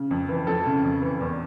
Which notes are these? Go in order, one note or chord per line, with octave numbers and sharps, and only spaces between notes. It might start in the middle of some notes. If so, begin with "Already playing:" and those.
Already playing: C#3
F2
E3
F2 A4
C#3
F2
E3
E2